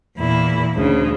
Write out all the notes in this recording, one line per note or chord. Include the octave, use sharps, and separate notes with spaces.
E2 A#2 E4
D2 C#3